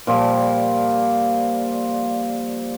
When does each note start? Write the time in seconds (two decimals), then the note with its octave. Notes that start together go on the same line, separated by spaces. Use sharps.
0.07 A#2 F3 G3